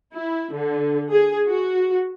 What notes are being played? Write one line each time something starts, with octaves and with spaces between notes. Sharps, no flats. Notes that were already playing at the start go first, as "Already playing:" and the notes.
E4
D3
G#4
F#4